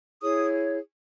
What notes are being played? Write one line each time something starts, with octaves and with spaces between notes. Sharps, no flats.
E4 G#4 C#5 D#6